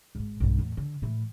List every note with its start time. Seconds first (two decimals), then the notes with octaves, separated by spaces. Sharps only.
0.15 G#1 G#2
0.40 B1 G2
0.59 E2 A2
0.77 D3
1.02 A2 E3